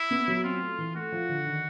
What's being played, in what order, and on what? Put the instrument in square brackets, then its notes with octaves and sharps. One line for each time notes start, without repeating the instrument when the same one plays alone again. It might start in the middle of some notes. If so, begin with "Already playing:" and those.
Already playing: [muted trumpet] E4
[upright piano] B3
F#3
[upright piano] C4 [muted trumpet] F4
[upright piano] A3
E3
[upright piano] A3 [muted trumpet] F#4
[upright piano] F3
D3
D#3